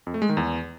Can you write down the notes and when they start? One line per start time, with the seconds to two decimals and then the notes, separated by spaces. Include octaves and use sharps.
0.07 F2
0.14 A3
0.22 G#3
0.29 D#3
0.37 E2